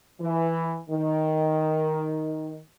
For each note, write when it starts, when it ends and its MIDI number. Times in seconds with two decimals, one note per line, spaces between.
0.20 0.76 52
0.89 2.58 51